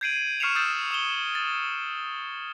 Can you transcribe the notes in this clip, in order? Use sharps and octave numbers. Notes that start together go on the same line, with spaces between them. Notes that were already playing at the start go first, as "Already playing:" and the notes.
G6 G#6 C7 D7 D#7 F#7
C#6 F6 C7 C#7 E7 F7
D#6 E6 G6 A6 C7
D#6 E7 F7 G7
A6